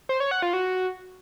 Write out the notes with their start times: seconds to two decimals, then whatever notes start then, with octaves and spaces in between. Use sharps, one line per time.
0.09 C5
0.20 C#5
0.31 F#5
0.42 F4
0.53 F#4